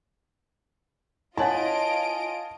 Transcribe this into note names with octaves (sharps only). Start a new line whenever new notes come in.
E4 F4 C#5 D#5 F#5 G#5 A5 D7